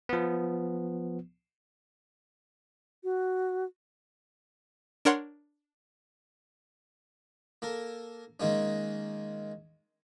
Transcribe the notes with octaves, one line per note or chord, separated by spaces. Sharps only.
F3 B3
F#4
D4 A#4 C#5 F#5 C6
A#3 A4 A#4
D#3 G#3 A#3 C#4